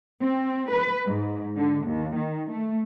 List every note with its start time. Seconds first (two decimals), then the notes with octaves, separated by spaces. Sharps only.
0.21 C4
0.70 B4
1.06 G#2
1.57 D3
1.87 D#2
2.17 D#3
2.51 A3